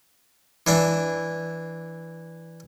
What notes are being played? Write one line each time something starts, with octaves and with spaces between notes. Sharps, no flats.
E3 D4 E4